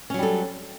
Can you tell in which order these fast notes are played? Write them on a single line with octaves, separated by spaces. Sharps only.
C#4 F#3 G3 A4